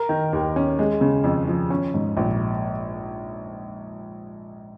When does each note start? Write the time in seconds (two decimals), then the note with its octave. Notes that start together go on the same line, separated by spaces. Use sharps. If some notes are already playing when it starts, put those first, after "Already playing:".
Already playing: A#4
0.09 D#3
0.33 D#2
0.56 C#4
0.79 G#3
1.01 C#3
1.24 F2
1.47 F3
1.70 C#4
1.94 G#2
2.17 A#1